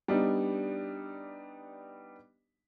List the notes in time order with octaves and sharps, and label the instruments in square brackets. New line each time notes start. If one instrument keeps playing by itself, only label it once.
[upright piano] G3 B3 D4 D#4